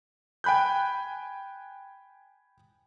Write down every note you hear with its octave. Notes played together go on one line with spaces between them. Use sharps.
G5 G#5 B5 F#6 G6